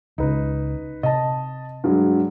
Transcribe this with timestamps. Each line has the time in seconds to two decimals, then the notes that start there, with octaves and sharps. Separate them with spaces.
0.18 C#2 C#3 D#4 B4
1.03 C3 D#5 A5
1.84 G2 F#3 G#3